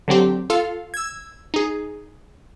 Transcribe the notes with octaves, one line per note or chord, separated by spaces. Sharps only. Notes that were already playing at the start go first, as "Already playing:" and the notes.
D3 F#3 C4 G4
F4 A4 F5
E6 G#6
D#4 G#4